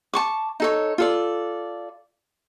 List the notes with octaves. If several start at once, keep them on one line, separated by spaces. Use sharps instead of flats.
A5 C#6 D6
D#4 A4 C#5
F4 A4 D5